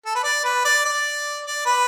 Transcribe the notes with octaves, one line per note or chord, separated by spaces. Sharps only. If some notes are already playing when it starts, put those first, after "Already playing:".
A4
B4
D5
B4
D5
D5
D5
B4